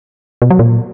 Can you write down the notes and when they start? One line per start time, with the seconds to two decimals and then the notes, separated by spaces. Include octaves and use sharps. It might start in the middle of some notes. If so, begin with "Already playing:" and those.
0.42 B2
0.50 F#3
0.59 A#2